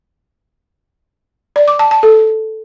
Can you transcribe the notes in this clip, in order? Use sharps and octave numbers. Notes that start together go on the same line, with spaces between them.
D5
D6
A5
A5
A4